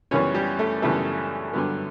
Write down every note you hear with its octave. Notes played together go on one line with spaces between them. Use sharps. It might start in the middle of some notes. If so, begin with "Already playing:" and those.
F#2 C#3 E3 G3 B3 C#4 C#5
G3 G4
A3 A4
F#2 C#3 E3 G3 A3 B3 A4
G2 D3 F#3 B3